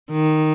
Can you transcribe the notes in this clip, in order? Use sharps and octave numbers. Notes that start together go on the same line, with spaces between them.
D#3